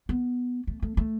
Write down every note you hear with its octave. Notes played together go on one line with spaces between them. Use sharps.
B3
A3
A3
A3